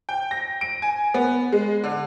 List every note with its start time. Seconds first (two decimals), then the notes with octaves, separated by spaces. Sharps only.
0.09 G5
0.31 A#6
0.61 D7
0.82 G#5
1.14 B3
1.52 G#3
1.84 D3